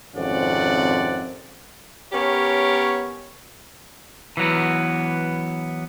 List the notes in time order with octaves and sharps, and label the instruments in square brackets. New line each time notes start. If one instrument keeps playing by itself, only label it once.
[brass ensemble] G#1 F2 C3 C#4 D5 F#5
[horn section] B3 C#4 G4 A#4 C#5
[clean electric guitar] E3 F#3 B3